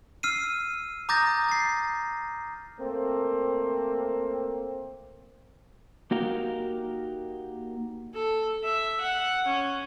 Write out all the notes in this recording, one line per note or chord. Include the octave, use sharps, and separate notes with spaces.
E6 F6 C7 D#7
A#5 D6 D#6 G6 A6 A#6
A6 C7
A3 A#3 C4
A#3 D#4 F#4 G4 A#4 F5
A4
E5
F#5
C#4